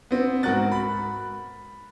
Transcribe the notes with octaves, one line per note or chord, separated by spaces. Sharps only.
B3 C4
G#2 F#4 A#4 F#6 A6
B5